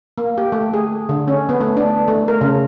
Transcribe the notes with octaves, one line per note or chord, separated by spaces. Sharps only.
A#3
G4
A3
G#4
D3
C#4
B3
A3
D4
A3
A#4
C#3